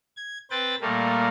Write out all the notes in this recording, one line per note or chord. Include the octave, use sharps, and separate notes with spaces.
G#6
C4 B4 G5 A6
A#2 G3 A3 A#3